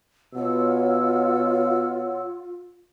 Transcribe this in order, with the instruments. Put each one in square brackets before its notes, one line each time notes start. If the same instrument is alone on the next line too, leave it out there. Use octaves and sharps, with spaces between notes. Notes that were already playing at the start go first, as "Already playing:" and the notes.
[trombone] B2 [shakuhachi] F4 [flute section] C#5 F#5 E6